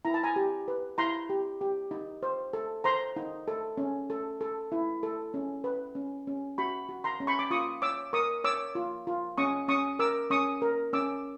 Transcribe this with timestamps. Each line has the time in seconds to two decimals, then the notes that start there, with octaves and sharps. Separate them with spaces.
0.05 E4 A#5
0.14 A5
0.24 G#5 A#5
0.36 G4
0.68 B4
0.98 E4 A#5 C6
1.30 G4
1.61 G4
1.91 D#4
2.23 C5
2.53 A4
2.84 C5 A#5 C6
3.16 D#4
3.48 A4
3.77 C#4
4.10 A4
4.41 A4
4.72 E4
5.03 A4
5.34 C#4
5.64 B4
5.95 C#4
6.27 C#4
6.58 F#4 B5 C#6
6.89 F#4
7.04 A#5 C6
7.20 C#4
7.27 B5 C#6
7.39 D6
7.51 F4 C#6 D#6
7.82 C#5 D6 E6
8.13 A#4 C#6 D#6
8.44 C#5 D6 E6
8.75 F4
9.07 F4
9.37 C#4 C#6 D#6
9.68 C#4 C#6 D#6
9.99 A#4 D6 E6
10.30 C#4 C#6 D#6
10.62 A#4
10.93 C#4 D6 E6